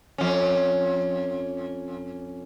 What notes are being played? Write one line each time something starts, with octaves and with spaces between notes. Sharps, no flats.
F2 C#4